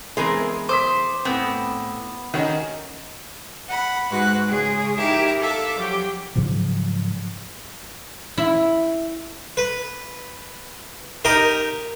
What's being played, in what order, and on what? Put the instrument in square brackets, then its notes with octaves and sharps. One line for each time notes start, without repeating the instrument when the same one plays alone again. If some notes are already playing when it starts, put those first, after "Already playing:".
[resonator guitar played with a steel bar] E3 B3 G#4 [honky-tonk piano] G#3 [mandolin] C4 A#4
[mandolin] C5 [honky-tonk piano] D6 D#6 B6
[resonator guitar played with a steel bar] A2 C4 [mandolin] B3
[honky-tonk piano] D#3 C#4 D#4 [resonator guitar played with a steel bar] F#4
[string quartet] F#5 B5
G#2 G#3 F#4 B4 F#6
C#3 G#3 G#4
D#4 E4 G4 A#4 E5
A4 E5 F5 D6
F3 F#3 G4
[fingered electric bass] G#2 C#3 F3 F#3
[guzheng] E4
[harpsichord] B4
D#4 G4 A#4